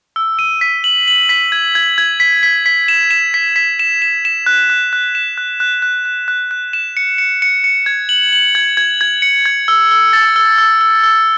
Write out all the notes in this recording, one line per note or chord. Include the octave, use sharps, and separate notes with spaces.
E6
D#7
B6
F#7
F#7
B6
G#6
G#6
G#6
B6
B6
B6
E7
E7
B6
B6
E7
E7
E7
F#6
F#6
F#6
E7
F#6
F#6
F#6
F#6
F#6
F#6
E7
C#7
C#7
C#7
C#7
G#6
F#7
F#7
G#6
G#6
G#6
C#7
G#6
E6
E6
A6
E6
E6
E6
E6